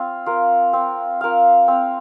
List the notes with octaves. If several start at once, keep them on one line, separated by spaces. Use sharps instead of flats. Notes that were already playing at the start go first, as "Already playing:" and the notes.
Already playing: C4 F4
F4 A#4
C4
F4 A#4 F5
C4